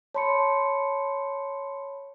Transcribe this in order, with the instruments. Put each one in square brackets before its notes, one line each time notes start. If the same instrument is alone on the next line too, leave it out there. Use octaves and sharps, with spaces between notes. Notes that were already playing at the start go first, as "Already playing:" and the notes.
[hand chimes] C#5 B5 [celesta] A5 C6 C#7